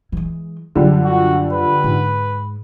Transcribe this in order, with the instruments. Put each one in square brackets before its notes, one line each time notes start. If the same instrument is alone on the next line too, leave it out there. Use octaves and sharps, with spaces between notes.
[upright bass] E3 G#3
[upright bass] F#2 [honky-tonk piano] D3 F3 G3
[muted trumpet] F#4
B4
[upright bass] G#2